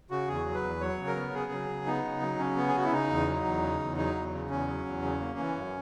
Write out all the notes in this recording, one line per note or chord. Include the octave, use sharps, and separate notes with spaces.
C#3 F#4
E2 G#4
F#3
B4
E2
F#3 C#5
C#3
A#4
B3
C#3 G#4
F#3
C#3
B3 D#4
C#3
F#3
C#3 C#4
B3
G#4
C#3 F#4
E4
C#3 D#4
E2
F#3
E2
C#3
E2
F#3 D#4
E2
C#3
E2 C#4
F#3
E2
C#3
A#3
E3
F#2